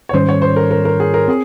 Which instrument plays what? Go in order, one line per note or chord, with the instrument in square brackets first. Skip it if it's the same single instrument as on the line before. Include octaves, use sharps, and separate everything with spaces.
[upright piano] C#5
[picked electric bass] G#2 D#3 G3 C#4 [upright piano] C5
[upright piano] C#5
C5
A#4
A#4
A#4
G#4
A#4
[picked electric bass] C4 [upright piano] G#4